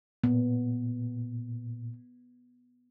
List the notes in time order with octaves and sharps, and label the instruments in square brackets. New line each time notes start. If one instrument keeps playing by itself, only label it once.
[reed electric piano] A#2 [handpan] B3